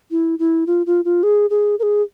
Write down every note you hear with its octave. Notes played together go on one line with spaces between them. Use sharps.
E4
E4
F4
F4
F4
G#4
G#4
A#4
G#4